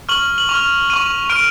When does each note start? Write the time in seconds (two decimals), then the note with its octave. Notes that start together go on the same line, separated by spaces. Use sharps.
0.09 C#6 F6 F#7
0.38 F#7
0.49 C#6 F6 F7
0.90 C#6 F6 D#7
1.30 C#6 F6 D7